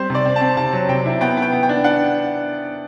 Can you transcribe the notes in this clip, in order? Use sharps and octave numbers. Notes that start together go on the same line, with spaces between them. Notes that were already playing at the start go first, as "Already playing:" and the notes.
Already playing: G3 C4 C5
C3 D5
C4
A5
C4
C3 A5
F#3
C3 G5
E4
B3 G5
B3
G5
B3
G5
D4
D4 F#5